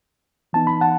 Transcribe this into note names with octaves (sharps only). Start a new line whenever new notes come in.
E3 B3 D#4 A5
B5
F#5 A5